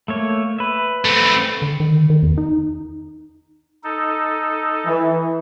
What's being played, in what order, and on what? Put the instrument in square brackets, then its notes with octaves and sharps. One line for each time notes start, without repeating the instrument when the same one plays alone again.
[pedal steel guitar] A3 A#3 C#5
B4 E5
[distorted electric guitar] A3 C4
[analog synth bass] D3
D#3
D#3
E2
D#4
[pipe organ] D#4 A4
[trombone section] E3